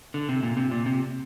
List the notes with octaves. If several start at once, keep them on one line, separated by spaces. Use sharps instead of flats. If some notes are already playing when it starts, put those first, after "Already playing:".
D3
C3
A#2
C3
A#2
C3